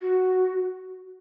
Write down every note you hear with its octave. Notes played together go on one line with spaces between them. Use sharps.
F#4